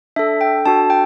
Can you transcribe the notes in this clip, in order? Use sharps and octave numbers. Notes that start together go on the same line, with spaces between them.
D4 A4 E5
G5
D4 F#4 A4 A5
G5